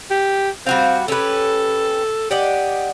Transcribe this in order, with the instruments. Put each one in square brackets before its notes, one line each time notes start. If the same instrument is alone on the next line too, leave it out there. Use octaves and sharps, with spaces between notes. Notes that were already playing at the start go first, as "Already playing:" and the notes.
[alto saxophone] G4
[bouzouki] G3 F#4 F5 [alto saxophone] C4
[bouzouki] C#4 G4 B4 [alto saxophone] A4
[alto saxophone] G4 [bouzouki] D5 D#5 F#5